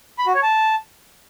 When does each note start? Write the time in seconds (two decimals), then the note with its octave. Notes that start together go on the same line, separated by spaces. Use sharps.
0.18 B5
0.27 F#4
0.35 C#5
0.43 A5